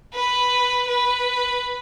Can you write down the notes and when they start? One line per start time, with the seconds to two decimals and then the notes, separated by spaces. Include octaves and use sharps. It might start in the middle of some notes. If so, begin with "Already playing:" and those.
0.14 B4
0.88 B4